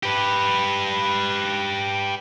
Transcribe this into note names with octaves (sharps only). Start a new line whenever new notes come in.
G4 B4